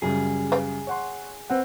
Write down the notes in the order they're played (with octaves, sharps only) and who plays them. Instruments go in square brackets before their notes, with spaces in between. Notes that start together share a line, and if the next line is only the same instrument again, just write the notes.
[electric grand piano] F#2 C#3 G3 [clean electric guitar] G#4
[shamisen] B4 F5 G5
[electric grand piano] C#5 F#5 C6
C4 B4 F#5